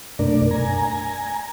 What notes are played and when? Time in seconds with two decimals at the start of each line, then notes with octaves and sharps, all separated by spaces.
0.19 F#2 B2 A3 D4 A#4 D5
0.51 G#5 A#5